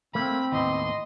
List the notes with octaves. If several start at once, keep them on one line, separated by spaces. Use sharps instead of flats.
A3 A#3 C4 B5
D#2 A2 B3 D#5 C6